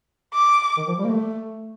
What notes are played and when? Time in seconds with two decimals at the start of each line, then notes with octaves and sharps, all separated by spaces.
0.34 D6
0.77 D#3
0.87 F3
0.98 G3
1.04 A#3
1.09 A3